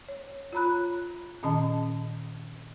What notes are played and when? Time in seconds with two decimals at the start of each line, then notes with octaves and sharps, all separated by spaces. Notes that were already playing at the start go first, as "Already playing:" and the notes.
0.09 C#5
0.53 F4 C#5 A#5 B5 F#6
1.43 A#2 D#3 C#4 D#5 A5